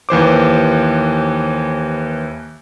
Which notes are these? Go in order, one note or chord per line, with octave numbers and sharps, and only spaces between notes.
D#2 E3 C5 D6